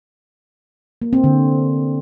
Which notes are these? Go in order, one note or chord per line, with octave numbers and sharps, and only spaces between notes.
A#3
C4
D3